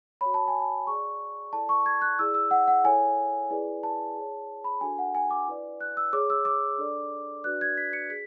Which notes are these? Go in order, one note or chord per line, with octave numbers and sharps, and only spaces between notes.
F#4 C#5 B5
A5
G#5
A5
G#4 D5 C#6
E4 A4 D5 A5
C#6
G#6
F#6
E4 G#4 D5 E6
E6
F#5
F#5
E4 A4 C#5 G#5
E4 G#4 B4 D5
A5
G#4 C#5
B5
D4 F#4 A4 G#5
F#5
G#5
D6
E4 B4 D5
F#6
E6
G#4 C#5 D6
E6
D6
D4 A4 D5
D4 F#4 B4 D5 F#6
G#6
B6
C#7
G#4 B6